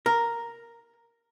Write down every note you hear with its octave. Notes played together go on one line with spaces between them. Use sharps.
A#4